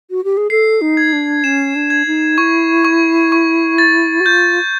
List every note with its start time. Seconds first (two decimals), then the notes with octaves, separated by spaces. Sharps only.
0.10 F#4
0.24 G4
0.37 G#4
0.50 A4 C7
0.81 D#4
0.97 G#6
1.13 D4
1.44 C#4 E7
1.75 D4
1.90 G#6
2.06 D#4
2.38 E4 C#6
2.85 C#6
3.32 C#6
3.78 A6
4.20 F#4
4.26 F4 G6